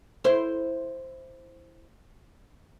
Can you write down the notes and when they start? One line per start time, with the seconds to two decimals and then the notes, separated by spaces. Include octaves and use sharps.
0.24 E4 C5